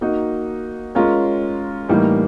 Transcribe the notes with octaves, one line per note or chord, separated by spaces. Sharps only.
A#3 D#4 F#4
G#3 C#4 F4 A#4 C#5
A2 E3 G3 A#3 D#4